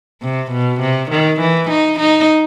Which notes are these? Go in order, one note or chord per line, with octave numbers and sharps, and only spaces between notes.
C3
B2
C3
D#3
E3
D#4
D#4